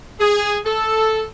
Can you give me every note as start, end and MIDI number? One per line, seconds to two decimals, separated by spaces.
0.20 0.57 68
0.66 1.22 69